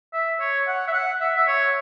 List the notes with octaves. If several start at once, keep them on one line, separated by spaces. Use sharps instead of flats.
E5
C#5
F#5
E5
F#5
E5
E5
C#5